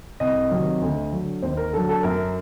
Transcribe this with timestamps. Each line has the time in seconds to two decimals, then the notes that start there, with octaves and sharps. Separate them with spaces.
0.20 C2 D#5
0.51 C3 D#3 F#3
0.82 D2
1.12 D3 F#3
1.42 D#2 C5
1.57 A#4
1.73 D3 F#3 A4
1.89 A4
2.03 F#2 A#4